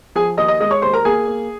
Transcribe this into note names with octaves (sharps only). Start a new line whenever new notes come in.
F3 G#4 G#5
D#2 D#5 D#6
D#5 D#6
G#3 D#5 D#6
C#5 C#6
D#2 C5 C6
A#4 A#5
A#3 G#4 G#5
A#3